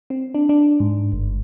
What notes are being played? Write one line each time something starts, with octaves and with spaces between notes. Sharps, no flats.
C4
D4
D4
G#2
G1